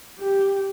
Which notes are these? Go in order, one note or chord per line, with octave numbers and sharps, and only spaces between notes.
G4